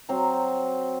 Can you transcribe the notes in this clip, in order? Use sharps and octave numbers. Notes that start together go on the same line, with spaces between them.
F#3 C4 A#5